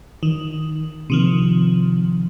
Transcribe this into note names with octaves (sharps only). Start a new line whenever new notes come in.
D#3
C3 D#3 F3